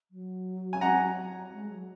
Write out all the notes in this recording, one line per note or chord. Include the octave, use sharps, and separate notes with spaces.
F#3
G#5
F#5 A#5
G#3
F#3